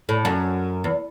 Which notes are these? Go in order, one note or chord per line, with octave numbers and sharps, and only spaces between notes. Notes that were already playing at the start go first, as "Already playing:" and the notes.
A2
F#2
E2